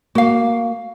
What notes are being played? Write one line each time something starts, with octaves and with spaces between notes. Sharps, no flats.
A#3 F#4 F5